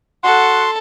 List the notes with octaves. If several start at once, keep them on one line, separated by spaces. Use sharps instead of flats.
F#4 A4 F#5 C6